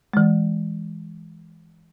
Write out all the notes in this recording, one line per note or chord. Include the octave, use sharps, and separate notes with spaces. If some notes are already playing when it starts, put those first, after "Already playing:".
E3 G#3